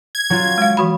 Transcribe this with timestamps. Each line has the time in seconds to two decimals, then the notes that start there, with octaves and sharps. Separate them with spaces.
0.15 G#6
0.30 F#3 F4
0.58 G#3 F5
0.77 E3 F#4 B5